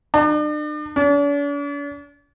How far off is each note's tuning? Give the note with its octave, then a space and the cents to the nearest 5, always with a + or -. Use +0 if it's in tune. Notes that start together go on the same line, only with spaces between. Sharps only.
D4 +40
D4 -45